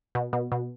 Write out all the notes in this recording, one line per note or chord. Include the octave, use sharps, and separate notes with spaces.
B2
B2
B2